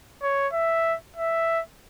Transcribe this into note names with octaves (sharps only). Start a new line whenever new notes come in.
C#5
E5
E5